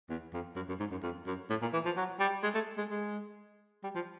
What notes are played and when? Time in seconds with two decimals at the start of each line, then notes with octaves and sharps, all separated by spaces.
0.09 E2
0.33 F2
0.56 F#2
0.68 F#2
0.80 G#2
0.91 F#2
1.03 F2
1.26 F#2
1.50 A2
1.62 A#2
1.73 E3
1.85 F3
1.97 F#3
2.20 G3
2.43 G#3
2.54 A3
2.78 G#3
2.90 G#3
3.83 G3
3.95 F3